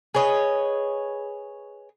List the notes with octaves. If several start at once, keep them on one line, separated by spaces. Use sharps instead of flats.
G#4 B4 C#5 D#5